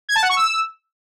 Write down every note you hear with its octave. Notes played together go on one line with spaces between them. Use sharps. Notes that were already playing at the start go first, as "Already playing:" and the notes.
G#6
A5
F#5
C#6
E6